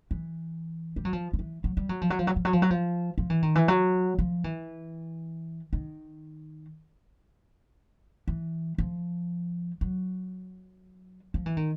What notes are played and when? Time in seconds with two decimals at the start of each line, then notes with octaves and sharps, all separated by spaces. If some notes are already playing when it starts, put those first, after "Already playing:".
0.11 E3
0.96 G3
1.05 F#3
1.13 F3
1.33 F3
1.39 E3
1.64 F#3
1.77 G3
1.89 F#3
2.01 F3
2.10 F#3
2.19 F3
2.27 F#3
2.36 F3
2.45 F#3
2.53 F3
2.62 F#3
2.71 F3
3.18 F3
3.30 E3
3.42 D#3
3.55 E3
3.68 F#3
4.19 F3
4.44 E3
5.73 D#3
8.28 E3
8.78 F3
9.81 F#3
11.34 F3
11.46 E3
11.57 D#3